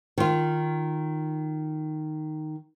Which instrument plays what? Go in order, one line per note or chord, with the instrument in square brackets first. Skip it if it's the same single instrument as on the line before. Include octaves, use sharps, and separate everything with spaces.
[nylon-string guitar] D#3 F4